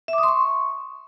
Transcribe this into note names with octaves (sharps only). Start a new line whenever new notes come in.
E5
D6
D#6
C6
C#6